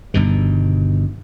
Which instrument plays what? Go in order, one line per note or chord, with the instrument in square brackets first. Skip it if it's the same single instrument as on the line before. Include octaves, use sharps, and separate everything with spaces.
[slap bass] G1 G2 B2 D#3